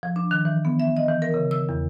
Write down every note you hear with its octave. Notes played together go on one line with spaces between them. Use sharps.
F3
D4
D#3
E3
B3
E5
D#5
E3
A#4
C#3
E6
E2